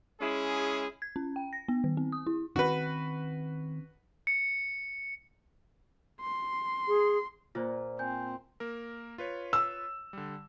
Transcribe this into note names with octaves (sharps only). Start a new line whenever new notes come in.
G#3 C#4 E4 G#4
G#6
C#4
G5
A#6
B3
D#3
C4
D#6
E4
D#3 C4 C#4 F#4 B4
C#7
C6
G#4
A#2 F4 C5 D5
C4 G#5 G6
A#3 A#4
F4 B4 C#5
E6
D3 G3